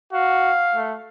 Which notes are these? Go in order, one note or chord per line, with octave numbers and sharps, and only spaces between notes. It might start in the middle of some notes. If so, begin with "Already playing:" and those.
F#4 F5
A3